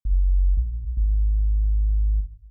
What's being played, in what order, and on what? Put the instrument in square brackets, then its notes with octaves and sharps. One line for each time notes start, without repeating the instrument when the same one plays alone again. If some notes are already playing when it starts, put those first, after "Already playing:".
[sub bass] F#1
A#1
G#1